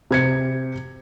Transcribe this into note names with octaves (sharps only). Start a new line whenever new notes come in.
C3 G#6 C#7